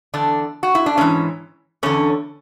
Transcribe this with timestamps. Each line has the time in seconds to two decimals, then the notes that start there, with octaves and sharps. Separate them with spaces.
0.14 E2 D3 D4
0.63 F#4
0.75 E4
0.86 D4
0.97 G#2 E3 C#4
1.83 E2 D3 C#4